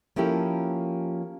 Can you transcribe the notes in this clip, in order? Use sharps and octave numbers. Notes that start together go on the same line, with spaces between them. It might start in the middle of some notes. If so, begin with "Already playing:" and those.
F3 A#3 C#4 E4 G4 A4